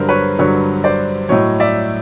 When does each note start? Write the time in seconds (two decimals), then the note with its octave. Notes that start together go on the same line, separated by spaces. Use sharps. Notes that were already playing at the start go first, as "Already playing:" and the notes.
Already playing: G2 D3 F#3 A#4 C5
0.09 B4 C#5
0.39 G2 D3 F#3 B4 C#5
0.84 C5 D5
1.29 A2 F#3 C#5 D#5
1.60 D5 E5